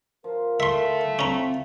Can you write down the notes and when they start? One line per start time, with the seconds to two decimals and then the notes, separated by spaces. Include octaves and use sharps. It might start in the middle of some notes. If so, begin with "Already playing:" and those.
0.24 F3 A#4
0.60 A3 E4 F4 E5 C6
1.19 C4 C#4 A#5